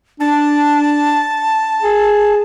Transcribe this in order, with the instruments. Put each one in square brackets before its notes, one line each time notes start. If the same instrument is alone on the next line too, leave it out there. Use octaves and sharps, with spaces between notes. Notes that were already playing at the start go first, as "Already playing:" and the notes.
[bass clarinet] D4 [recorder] A5
[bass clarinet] G#4